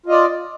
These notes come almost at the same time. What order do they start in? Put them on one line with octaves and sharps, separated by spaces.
F4 D#5 D5